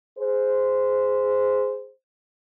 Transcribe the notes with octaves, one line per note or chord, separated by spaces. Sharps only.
G#4 C5